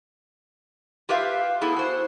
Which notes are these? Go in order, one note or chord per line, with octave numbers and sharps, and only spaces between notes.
F4 G4 B4 E5 F5
A3 B3 E4 G#4
F#4 C5